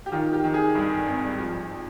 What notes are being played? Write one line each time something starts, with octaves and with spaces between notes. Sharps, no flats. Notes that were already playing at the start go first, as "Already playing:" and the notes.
G4
D#3 F4
G4
D#3
G#4
G2
G#1
F3